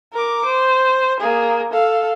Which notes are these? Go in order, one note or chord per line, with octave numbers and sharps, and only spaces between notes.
A#4 D6
C5
A#3 G#4
A4 F5